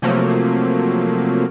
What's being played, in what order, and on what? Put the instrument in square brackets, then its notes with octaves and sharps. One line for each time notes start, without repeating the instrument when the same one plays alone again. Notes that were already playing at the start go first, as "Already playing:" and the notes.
[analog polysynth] C3 F3 F#3 A3 A#3